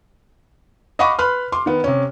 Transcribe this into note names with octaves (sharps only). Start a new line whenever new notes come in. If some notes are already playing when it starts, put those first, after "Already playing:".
D#5 F5 F#5 B5 C#6 D6
B4 B5 C6 F6
C6 D6
D#3 B3
C3 C#4